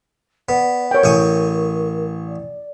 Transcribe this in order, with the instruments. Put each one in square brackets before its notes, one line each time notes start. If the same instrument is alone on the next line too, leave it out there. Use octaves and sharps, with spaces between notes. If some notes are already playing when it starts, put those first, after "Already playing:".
[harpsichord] B3 [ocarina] D5
[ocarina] A#4 [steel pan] C#5 G5
[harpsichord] A1 C#6 D#6
[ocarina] D5